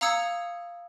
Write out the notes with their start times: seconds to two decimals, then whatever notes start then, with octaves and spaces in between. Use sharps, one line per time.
0.01 F5 A#5 D#6 E6 G#6 C#7